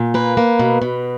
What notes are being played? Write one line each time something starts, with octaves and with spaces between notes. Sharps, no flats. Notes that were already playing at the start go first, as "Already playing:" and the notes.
Already playing: A#2
A#3 B4
A#3
B2
B2